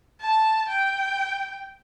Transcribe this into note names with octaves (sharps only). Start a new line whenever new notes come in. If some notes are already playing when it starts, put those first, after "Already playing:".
A5
G5